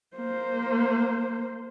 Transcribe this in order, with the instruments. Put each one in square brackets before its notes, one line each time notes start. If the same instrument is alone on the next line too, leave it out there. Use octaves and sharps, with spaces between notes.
[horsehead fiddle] A#3 C5